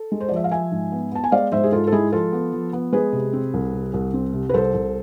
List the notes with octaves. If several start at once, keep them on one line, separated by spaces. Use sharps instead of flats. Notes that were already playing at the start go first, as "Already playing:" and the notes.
Already playing: A4
G#3
C5
F3 D5
E5
F5
F3 E5 G#5
G#2
B3
B3 A5
G#5
G#3 D5 F5
G#2 C5 E5
G#4
G#2 F4 A4
A4
G#3 E4 G#4
F3 F4 A4
B3
F3
B3
G#3 G#4 B4
C3
C4
C2
C3
C2
C4
C3
B4
C2 A4 C5
C2